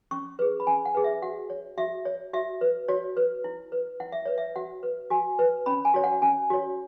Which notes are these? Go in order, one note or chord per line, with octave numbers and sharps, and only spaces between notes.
C#4 C#6
G#4 B4
B5
C#4 G#5
F#5
G#4 B4
E5
F#4 F#5
C#5
F#4 E5
C#5
F#4 E5
B4
F#4 C#5
B4
E4
B4
E4 F#5
E5
B4 C#5
E5
F#4 F#5
B4
F#4 G#5
B4
C#4 B5
G#5
F#4 C#5
F#5
C#4 G#5
F#4 C#5